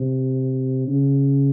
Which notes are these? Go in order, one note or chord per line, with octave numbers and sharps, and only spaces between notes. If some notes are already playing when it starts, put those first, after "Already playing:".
Already playing: C3
C#3